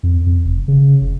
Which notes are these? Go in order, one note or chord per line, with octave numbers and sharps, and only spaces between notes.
F2
F2
F1
C#3
F1